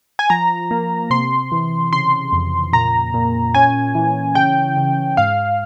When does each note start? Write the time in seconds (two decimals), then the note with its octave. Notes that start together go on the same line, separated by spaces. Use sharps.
0.19 G#5
0.30 F3 A#5
0.71 A#3
1.10 C3 C6
1.52 E3
1.92 C#3 C6
2.32 F2
2.73 A#2 A#5
3.14 A#2
3.54 C#4 G#5
3.95 E3
4.35 C#3 G5
4.77 C#3
5.17 G#2 F5